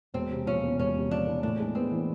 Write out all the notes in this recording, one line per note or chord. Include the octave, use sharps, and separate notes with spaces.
E1 C4
C3
F3 C#4
E2
E1 C#4
C3
F3 D4
E2
A2 D4
G#3
B3 C4
E3